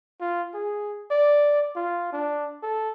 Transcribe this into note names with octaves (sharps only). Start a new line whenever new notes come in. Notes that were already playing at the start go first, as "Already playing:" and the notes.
F4
G#4
D5
F4
D4
A4